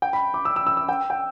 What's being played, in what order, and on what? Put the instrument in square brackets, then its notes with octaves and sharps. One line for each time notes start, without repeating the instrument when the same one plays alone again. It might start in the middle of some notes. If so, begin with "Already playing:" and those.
[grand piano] G5
B5
D6
E6
E6
E6
E6
G5
G5